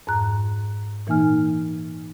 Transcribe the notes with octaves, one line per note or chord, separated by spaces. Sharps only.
F2 G#2 A#5 F#6
A#2 E3 A#3 D#4 G#5 F6